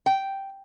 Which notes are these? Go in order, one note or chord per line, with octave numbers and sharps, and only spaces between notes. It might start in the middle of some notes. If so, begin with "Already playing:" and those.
G5